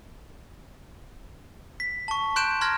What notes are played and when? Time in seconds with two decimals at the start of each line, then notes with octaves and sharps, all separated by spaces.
1.80 B6
2.08 A5 C#6
2.36 C6 F#6 G6 D7 E7
2.61 A#5 C6 F6 G#6 A#6